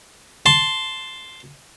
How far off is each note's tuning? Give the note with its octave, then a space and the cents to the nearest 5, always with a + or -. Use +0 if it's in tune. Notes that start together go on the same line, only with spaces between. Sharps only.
A5 +0 C6 +0